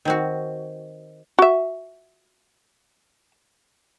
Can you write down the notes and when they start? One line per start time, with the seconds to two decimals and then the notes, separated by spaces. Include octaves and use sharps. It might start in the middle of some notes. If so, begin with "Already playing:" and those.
0.05 D#3 C4 F#4
1.39 F#4 E5